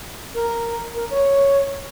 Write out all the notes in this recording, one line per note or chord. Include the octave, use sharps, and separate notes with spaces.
A#4
A#4
C#5